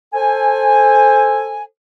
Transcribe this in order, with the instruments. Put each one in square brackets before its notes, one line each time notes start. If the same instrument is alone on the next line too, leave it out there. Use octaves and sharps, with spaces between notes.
[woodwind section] A4 C5 G#5